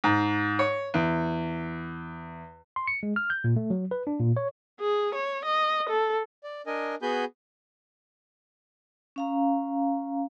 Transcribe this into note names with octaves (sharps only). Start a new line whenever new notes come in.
G#2
C#5
E2
C6
C#7
G#3
F6
G6
A#2
A3
F#3
B4
D4
A#2
C#5
G#4
C#5
D#5
A4
D5
D4 A#4 D#5 G#5
B3 F#4 G#4 G#5 B5 G6
C#4 F5 A#5